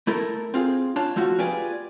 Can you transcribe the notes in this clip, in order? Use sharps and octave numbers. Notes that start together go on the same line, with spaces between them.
A3 E4 A4 A#4
C4 F4 G#4
D4 F4 C#5 F5 A5
F3 A3 F4 F#4
F4 G4 G#4 B4 D5